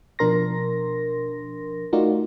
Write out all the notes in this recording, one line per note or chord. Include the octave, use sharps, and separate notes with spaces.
B2 F3 D4 A#4 C6 A#6
A3 D#4 F4 F#4 A#4 D5